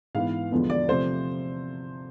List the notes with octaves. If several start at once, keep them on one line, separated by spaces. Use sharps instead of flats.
G#2 E3 B3 F5
E2 D3 F3 G#3 B3
D5
C3 F3 A3 C5